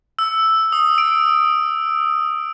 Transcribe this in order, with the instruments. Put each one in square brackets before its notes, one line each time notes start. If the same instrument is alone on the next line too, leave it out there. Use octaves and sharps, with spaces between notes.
[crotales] E6
D#6
D7